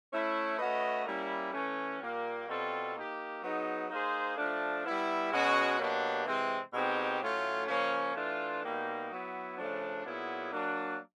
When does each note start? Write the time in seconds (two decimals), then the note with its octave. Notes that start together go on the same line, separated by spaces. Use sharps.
0.11 A3 C#4 E4
0.58 A3 C#4 F#4 B4 D#5
1.05 G3 A#3 C#4 E4
1.52 E3 A3 C#4
2.00 A#2 G3 A#3
2.48 B2 G3 C4 F4 A4
2.95 A#3 D#4 G4
3.42 F#3 B3 D#4 G#4
3.90 A#3 D#4 G#4 C5
4.36 F3 A3 D4
4.85 G3 B3 E4
5.32 B2 G#3 C#4 F#4
5.79 B2 F#3 A#3 D4 G4
6.25 C3 E3 G#3 C4
6.73 B2 G#3 C4 D#4 G4
7.20 A2 F#3 A3 C#4 F4
7.67 C#3 F3 A#3 C#4
8.15 E3 A3 D4 F4
8.63 B2 G3 A#3 D#4
9.10 F#3 B3 E4
9.58 C#3 F3 A3 D4
10.04 A#2 F#3 B3 E4 G#4
10.52 F#3 A#3 D4